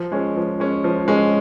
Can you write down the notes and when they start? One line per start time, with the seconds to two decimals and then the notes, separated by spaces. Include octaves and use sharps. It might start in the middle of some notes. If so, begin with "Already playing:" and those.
Already playing: F3
0.12 G#3 C#4
0.36 F3
0.60 G#3 C#4
0.84 F3
1.08 G#3 C#4